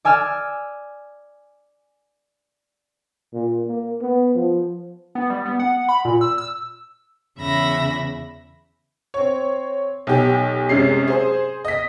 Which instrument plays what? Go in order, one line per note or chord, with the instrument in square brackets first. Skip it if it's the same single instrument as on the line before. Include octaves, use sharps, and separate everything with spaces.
[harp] D5 G#5 E6 F6
[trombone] A#2
A#3
B3
F3
[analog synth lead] B3
G3
B3
F#5
B5
A#2
E6
E6
[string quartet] E2 C#3 E5 B5 A#6
[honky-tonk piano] C4 C#5
B1 G4
F#2 C3 G#3 C#4 C7
G#4 C5
D#5 B6